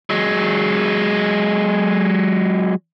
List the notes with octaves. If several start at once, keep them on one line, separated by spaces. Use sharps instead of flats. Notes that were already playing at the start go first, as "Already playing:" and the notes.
F#3 G#3